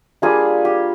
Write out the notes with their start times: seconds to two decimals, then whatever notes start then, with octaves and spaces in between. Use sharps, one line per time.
0.22 G3 A#3 D4 F4 G#4
0.65 G4